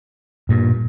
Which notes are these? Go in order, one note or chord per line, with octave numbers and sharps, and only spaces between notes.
G2 A#2